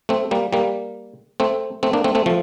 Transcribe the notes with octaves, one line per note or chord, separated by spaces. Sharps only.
A3 C4
G3 A#3
G3 A#3
A3 C4
A3 C4
A#3 D4
A3 C4
A3 C4
F3 A3